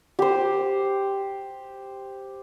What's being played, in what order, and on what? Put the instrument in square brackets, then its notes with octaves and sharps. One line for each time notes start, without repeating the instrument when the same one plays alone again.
[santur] G4 C5